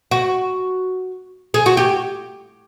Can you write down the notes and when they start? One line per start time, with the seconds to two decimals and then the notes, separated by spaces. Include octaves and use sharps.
0.11 F#4
1.54 G#4
1.66 F#4
1.77 G4